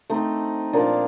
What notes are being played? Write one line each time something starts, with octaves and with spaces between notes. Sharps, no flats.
A3 C4 D#4
A#2 F3 A#3 D4